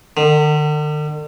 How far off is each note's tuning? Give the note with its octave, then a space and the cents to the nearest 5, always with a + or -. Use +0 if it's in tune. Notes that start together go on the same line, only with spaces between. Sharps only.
D3 +45